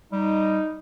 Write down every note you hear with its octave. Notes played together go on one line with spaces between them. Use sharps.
G3 D#4